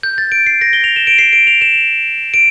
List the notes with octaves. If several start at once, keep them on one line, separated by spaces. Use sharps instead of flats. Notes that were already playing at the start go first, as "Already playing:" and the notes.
G6
A6
D7
C7
A#6
G7
F7
E7
D7
C7
D7
F7
E7
D7